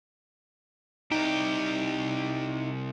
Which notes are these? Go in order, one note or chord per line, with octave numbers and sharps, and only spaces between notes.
C2 D#4 G4